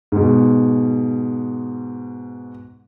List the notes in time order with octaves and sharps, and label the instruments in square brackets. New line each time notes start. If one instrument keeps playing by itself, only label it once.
[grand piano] G#2 B2